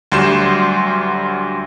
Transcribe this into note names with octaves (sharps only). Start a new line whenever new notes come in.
D2 F#3 G3 C6 G6 E7